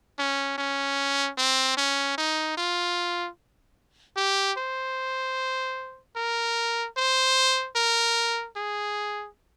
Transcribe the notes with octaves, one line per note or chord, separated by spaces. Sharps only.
C#4
C#4
C4
C#4
D#4
F4
G4
C5
A#4
C5
A#4
G#4